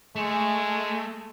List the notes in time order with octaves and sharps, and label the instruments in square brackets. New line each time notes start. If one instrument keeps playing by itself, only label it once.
[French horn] G#3 [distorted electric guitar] A3